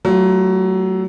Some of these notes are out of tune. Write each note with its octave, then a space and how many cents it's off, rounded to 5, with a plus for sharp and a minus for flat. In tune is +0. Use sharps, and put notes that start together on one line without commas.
F#3 +25 A3 +10 F4 +0